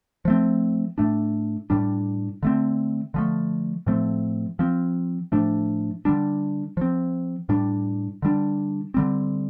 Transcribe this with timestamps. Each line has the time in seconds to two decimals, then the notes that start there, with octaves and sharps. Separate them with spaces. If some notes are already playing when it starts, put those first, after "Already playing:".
0.25 F3 A3 C4
0.98 A2 A3 D4
1.70 A2 G3 D4
2.43 D3 A3 C4
3.14 D3 F3 A3
3.87 A2 F3 A3 C4
4.59 F3 C4
5.32 A2 F3 A3 D4
6.05 D3 G3 D4
6.77 F3 C4
7.49 A2 G3 D4
8.22 D3 G3 D4
8.94 D3 G3 C4